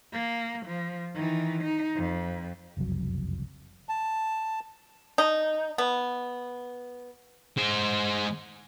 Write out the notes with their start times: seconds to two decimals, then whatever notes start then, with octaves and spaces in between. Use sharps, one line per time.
0.13 A#3
0.66 F3
1.14 D#3 E3
1.64 D#4
1.95 F2
2.77 F#1 C2 F2 F#3
3.89 A5
5.18 D#4
5.78 B3
7.58 G#3 C5